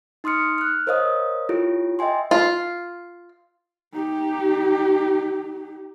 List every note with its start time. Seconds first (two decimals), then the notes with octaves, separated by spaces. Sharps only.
0.24 D#4 C6 D#6 F6 C#7
0.58 F6 F#6
0.87 A#4 C5 C#5 D#5 F5 D#6
1.49 E4 F4 G4 A4 C#5
1.99 D#5 E5 G5 G#5 C6
2.31 F4
3.93 D#4 G4